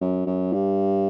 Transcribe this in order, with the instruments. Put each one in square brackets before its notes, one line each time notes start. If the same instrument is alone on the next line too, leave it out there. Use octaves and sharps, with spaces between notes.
[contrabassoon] F#2
F#2
G2